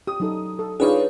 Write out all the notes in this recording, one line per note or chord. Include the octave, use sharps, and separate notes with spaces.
G4 D#6
F#3 D#4 A4
A4
D4 D#4 F4 G#4 B4 C#5